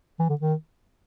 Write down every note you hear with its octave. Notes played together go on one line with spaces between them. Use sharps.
E3
D3
D#3